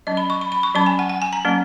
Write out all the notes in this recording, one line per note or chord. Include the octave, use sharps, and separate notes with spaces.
F#3 C#4 D#5
B5
C#6
B5
B5
C#6
F#3 C#4 B5
G#5
F#5
F#5
G#5
A#5
F#3 A#3 C#4